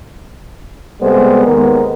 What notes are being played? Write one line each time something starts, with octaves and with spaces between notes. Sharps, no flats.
C3 G3 G#3 B3 A4 C5
D#2 D#3 G#3 B3 A#4